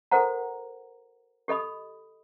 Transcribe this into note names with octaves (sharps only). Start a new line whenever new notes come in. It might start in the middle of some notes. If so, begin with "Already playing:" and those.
F#4 A4 A#4 C5 F#5 A#5
G4 A4 D#5 B5 D#6